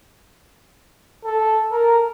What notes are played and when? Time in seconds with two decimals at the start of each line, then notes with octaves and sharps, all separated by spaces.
1.25 A4
1.72 A#4